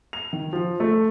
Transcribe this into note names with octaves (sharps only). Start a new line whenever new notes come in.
F7
D#3
F3
A3